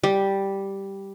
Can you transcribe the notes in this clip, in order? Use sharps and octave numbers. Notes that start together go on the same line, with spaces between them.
G3